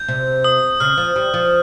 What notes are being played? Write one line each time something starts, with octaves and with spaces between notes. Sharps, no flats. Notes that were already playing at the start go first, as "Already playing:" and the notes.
Already playing: G6
C3
D#6
C#3 F6
F3
G3
F3